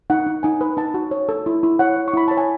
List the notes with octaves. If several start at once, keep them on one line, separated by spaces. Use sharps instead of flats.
D#4 F#5
D#4
D#4 G#5
B4
D#4 A5
F#4
C#5
A4
E4
E4
C#5 F#5
C#5
C#6
E4 B5
C#5 A5
G#5